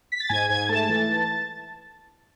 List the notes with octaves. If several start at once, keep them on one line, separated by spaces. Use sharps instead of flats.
B6
A6
G#2 G#5 G#6
G#2 G#5 G#6
A3 A5 A6
E3